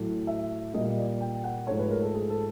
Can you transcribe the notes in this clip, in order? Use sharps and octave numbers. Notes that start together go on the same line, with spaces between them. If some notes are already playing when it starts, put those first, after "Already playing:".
Already playing: A2 F#3 A3
E5
A#2 G3 A#3 D#5
D5
G5
F#5
G#2 F3 A3 C#5
B4
A#4
A4
G#4
A4